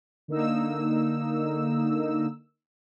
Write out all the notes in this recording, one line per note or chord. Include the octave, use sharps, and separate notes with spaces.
D3 A#3 D#4 E6